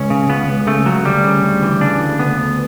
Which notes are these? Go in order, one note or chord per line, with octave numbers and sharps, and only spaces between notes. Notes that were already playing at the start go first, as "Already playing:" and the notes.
Already playing: C#2 C#4
C#3
C#2 B3
C#2
C#3 A3
C#2 F#3
D2 G3
C#3
D2
E3
C#3 D4
D2
D2 B3
D2